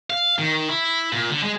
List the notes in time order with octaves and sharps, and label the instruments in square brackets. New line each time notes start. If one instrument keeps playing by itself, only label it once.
[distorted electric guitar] F5
D#3
E4
A#2
D3
G#3